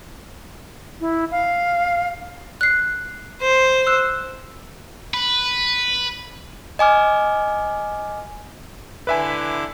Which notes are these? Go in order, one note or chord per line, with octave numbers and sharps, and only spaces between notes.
E4
F5
F#6 C7
C5
E6 F#6 E7
B4
D#5 G#5 D6 F6
D3 E4 B4 E5 G#5 D6